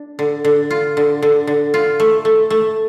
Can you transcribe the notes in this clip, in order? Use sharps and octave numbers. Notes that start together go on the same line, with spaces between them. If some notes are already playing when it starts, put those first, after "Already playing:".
Already playing: D4
D3
D3
F4
D3
D3
D3
F4
A3
A3
A3